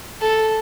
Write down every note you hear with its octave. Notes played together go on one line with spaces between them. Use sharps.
A4